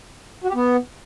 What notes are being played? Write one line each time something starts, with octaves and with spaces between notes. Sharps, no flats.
F#4
G4
B3